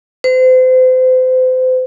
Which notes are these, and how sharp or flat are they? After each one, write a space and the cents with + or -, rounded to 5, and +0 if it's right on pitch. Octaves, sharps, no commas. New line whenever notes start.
C5 -35